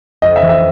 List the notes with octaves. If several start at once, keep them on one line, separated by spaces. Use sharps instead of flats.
F2 D#5
E5
E3
E5